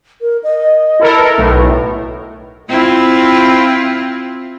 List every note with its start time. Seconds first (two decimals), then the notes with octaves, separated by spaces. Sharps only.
0.21 A#4
0.43 D#5
1.00 E4 A4 A#4
1.17 B4
1.38 B1 A2
2.70 C4 E4 F4